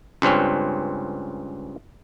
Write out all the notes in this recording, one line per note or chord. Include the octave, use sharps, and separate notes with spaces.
C#2 G2 C4 C#4